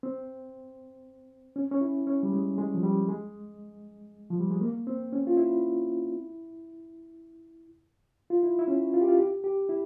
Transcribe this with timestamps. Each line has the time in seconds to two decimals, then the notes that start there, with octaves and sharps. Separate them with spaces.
0.03 C4
1.56 C#4
1.72 C#4
1.81 E4
2.07 C#4
2.23 G3
2.33 G#3
2.58 G#3
2.74 F3
2.83 G3
3.09 G#3
4.30 F3
4.40 G3
4.50 G#3
4.61 A#3
4.87 C4
5.13 C#4
5.27 F4
5.37 E4
8.30 F4
8.43 E4
8.59 E4
8.68 C#4
8.94 F4
9.01 G4
9.08 F4
9.18 G4
9.44 G4
9.69 E4